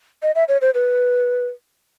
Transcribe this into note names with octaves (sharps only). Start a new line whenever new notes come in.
D#5
E5
C#5
C5
B4